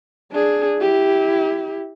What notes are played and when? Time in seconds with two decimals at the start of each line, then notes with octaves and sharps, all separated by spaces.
0.32 D4 G#4
0.79 E4 G4